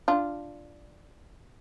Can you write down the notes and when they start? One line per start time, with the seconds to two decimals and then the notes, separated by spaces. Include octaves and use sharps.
0.08 D4 F4